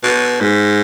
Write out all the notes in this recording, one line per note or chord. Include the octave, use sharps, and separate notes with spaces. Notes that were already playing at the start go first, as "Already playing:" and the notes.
B2
G#2